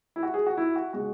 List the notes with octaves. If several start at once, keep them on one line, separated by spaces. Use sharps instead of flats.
E4
F#4
G#4
F#4
E4
F#4
C#3 G#3 F#4